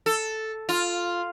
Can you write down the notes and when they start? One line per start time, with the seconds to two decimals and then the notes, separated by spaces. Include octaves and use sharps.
0.06 A4
0.69 F4